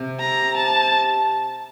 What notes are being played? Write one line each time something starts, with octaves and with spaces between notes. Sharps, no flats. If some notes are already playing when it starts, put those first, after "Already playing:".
Already playing: C3
A#5
A5